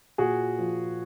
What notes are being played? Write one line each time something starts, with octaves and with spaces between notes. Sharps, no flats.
A#2 F#4 G#4
F3